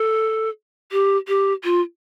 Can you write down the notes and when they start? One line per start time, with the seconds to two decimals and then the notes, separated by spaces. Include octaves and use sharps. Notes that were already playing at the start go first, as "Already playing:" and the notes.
Already playing: A4
0.92 G4
1.28 G4
1.64 F4